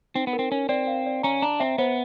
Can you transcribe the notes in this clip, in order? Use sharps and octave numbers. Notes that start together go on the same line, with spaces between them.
C4 D#4
B3
A#4
C4
C#4 A#4
C4 D5
F5
D5
C#4 A#5
D4 A#5
C4 E5
B3 C5